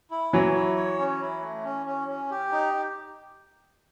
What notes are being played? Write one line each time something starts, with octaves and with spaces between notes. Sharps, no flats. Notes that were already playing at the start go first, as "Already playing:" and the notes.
E4
E3 F#3 C#5
E4
C#5
C#4
E4
A3
C#4
C#4
C#4
G4
D#4